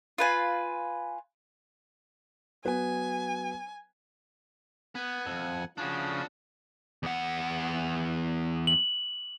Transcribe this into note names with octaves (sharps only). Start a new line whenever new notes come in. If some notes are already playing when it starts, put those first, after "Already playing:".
F4 B4 G#5
F#3 B3 B4 G#5
B3 F#5 G#5
F2
C#3 F3 C#4 D4 F#4
E2 F#5
F#7